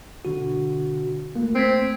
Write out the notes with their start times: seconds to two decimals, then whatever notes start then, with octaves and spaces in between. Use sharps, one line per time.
0.25 B2 D3 F#4
1.35 G1 A3 A#3
1.55 A3 C4 G#6 B6